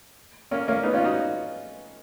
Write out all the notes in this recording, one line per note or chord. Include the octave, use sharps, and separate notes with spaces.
A#3 C#4
A#3 C#4
B3 D#4
C#4 F4
D#4 F#4